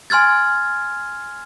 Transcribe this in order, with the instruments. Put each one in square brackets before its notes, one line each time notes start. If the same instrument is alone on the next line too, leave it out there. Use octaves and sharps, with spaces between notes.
[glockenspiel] G#5 C6 F6 G#6 A6